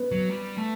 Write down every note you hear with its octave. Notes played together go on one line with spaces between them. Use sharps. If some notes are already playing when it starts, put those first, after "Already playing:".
Already playing: B3
F#3
G3
A3